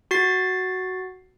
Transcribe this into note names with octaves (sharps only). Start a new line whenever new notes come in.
F#4 A6 C7